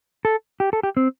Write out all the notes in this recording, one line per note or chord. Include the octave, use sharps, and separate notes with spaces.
A4
G4
A4
G4
C4